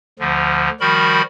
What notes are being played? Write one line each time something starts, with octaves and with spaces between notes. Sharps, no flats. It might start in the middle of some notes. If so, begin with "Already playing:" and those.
D2 D3 F3
D#3 F3 G3 F#4 A#4 B5